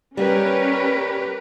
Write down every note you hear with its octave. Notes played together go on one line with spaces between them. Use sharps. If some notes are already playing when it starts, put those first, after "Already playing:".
G3 A#3 C#4 G4 A#4 B4